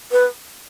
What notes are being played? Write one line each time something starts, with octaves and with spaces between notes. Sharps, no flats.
B4